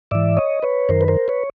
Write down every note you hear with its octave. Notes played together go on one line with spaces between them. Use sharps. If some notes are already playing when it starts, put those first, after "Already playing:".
G#2 E3 D5 E5
C#5 D#5
B4 C#5
F#2 D#3 A#4 C5
B4
A#4 C5
B4 C#5